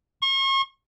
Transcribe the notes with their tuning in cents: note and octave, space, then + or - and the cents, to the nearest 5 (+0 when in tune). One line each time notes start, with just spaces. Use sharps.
C#6 -40